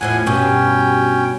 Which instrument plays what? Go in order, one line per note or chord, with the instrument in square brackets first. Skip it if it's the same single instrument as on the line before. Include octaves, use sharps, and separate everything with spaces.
[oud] E2 A2 F3 [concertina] F#5 G#5
[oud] G2 B2 [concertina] C#4 G5